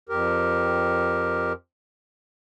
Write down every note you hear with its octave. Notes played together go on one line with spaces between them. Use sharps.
F2 G4 A#4